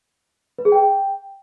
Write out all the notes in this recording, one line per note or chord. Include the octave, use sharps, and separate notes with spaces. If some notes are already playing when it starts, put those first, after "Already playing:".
B4
G#4
G5